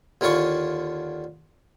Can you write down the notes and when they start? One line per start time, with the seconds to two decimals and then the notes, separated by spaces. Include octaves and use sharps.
0.21 D#2 D3 E4 F4 C#6